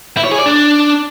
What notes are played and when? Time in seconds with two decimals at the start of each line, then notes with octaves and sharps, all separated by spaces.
0.17 E4
0.24 C#5
0.31 G#4
0.39 D5
0.46 D4